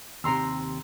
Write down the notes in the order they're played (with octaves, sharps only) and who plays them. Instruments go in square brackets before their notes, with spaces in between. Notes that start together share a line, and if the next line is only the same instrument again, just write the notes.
[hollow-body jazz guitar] D#2 C3 [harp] A#5 C6 E6